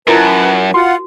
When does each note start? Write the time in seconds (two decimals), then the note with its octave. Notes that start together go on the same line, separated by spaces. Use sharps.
0.07 F#2 E4 F4 A#4 B4 A5
0.74 F4 F#4 F#5